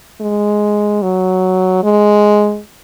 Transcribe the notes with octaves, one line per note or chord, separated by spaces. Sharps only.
G#3
F#3
G#3